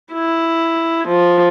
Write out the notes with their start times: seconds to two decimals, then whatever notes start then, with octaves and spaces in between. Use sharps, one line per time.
0.13 E4
1.08 F3